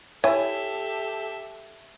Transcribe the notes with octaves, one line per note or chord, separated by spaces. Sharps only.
E4 G4 A4 C#5 E5 G#5